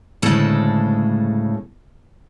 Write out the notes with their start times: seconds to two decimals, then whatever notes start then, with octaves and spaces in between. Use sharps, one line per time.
0.22 D2 A2 C#3 G#3 A4 A5